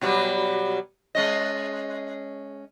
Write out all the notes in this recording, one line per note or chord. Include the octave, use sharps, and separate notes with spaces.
B2 F#3 G3
G#3 C#4 D#5